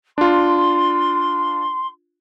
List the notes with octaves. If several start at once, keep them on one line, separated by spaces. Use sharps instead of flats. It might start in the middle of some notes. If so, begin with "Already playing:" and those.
D4 F4 C6